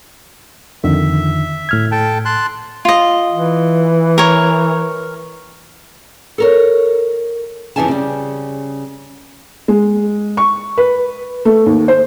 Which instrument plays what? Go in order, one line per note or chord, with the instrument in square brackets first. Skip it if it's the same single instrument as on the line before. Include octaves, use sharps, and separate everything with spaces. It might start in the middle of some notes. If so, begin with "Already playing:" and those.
[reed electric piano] F2 D3 D#3 [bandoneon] E5
[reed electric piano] A2 F6 G#6
[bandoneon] A4 G5 A5
A5 C6 F#6
[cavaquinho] F4 D#5
[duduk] E3
[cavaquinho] A#4 C#5
[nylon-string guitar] A4 A#4 C#5
F2 C#3 E3 E5 G#5 A5
C#3 G3
[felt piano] G#3
C#6
B4
A3
D#2
C5